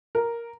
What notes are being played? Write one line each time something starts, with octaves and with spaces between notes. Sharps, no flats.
A#4